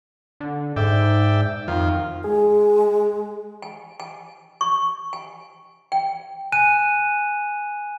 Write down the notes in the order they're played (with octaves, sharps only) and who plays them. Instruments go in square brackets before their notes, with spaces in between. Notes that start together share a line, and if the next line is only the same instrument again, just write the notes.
[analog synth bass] D3
[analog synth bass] G#2 [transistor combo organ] D5 E5 G5
[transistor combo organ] F2 F4 [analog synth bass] D#3
[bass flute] G#3 [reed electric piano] G#4
[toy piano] G#5
G#5
C#6
G#5
G5
[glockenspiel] G#5 F#6 D#7 E7